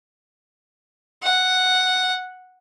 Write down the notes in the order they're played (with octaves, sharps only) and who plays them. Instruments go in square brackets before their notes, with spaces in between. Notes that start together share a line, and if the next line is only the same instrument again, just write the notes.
[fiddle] F#5